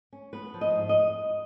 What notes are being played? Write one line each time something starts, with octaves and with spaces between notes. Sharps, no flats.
C#4
B3 B4
F3
D#5
G#2
D#5